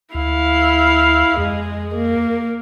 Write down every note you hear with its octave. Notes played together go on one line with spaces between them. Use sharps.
D2 E4 F5
F2 G#3 G#4
A#3